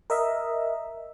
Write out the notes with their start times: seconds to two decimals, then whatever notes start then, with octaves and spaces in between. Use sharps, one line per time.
0.10 A#4 D#5 E5